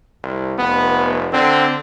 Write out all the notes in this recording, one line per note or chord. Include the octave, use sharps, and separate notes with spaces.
C2
F1 B3
D3 C4